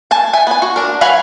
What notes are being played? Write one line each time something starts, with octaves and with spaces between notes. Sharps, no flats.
G#5 A5
E5 G#5
B3 G#5
F#4
D4 A#4
F#3 B4 F5 F#5 G#5